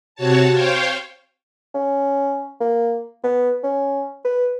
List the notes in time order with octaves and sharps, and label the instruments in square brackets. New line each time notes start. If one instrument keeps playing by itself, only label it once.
[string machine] C3 F#4 C#5 A5
C5 C#5 F5 G5
[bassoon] C#4
A#3
B3
C#4
B4